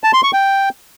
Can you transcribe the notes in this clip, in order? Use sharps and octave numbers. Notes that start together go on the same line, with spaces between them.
A5
C6
C#6
G5